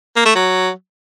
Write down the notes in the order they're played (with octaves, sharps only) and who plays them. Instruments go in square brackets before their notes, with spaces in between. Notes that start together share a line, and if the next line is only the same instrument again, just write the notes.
[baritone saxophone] A#3
A3
F#3